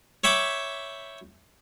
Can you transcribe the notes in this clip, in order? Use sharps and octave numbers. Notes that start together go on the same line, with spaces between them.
C#5 E5 G5 B5 D6